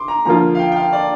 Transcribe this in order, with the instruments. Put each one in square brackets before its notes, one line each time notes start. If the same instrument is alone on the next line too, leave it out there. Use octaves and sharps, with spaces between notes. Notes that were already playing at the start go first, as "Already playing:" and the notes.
Already playing: [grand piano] C6 D6
A#5
[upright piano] D3 F3 A#3 F4 [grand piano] A#5
[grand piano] F5
G5
G5
F5
D5